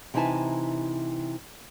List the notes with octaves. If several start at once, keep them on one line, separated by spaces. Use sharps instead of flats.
C3 E3 D#4 E4 G#5 A5